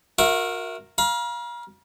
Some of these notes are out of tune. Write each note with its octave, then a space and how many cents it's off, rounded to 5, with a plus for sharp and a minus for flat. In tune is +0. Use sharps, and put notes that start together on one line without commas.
F#4 -35 A#4 +0 E5 +0
F5 +0 A#5 +45